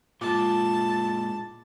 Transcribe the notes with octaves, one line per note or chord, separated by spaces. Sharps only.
A#2 G#3 F4 A5 D6